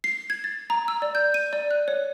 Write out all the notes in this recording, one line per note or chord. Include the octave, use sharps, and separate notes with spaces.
C7
G#6
A6
A#5
E6
D5
G6
D#7
D5
F#6
C#5